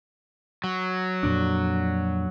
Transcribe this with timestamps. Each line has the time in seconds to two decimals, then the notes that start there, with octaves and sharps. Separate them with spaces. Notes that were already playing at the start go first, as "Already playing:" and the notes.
0.64 F#3
1.23 F2 A#2 D4